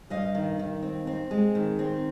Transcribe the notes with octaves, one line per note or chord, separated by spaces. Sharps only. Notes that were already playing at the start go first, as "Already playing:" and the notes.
G2 D#5 F5
D#3
D#3
C4
C4
G#3
D#3
C4